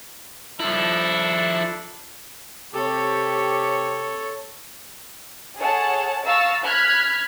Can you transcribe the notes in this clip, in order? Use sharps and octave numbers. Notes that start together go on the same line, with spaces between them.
F3 D4 E4 A4
C3 G4 A4 C#5
G#4 A4 C#5 F#5 A5
F5 A#5 C#6 E6 A6
B5 F6 F#6 G#6 B6